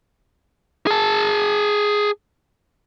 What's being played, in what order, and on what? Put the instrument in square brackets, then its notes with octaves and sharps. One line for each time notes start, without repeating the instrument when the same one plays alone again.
[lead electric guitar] G#4 A5